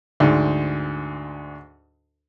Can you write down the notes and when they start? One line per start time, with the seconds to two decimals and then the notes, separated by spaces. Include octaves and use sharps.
0.20 D2 G#2 D4